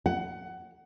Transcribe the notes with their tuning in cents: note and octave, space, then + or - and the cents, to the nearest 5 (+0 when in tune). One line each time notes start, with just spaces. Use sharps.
F#5 +20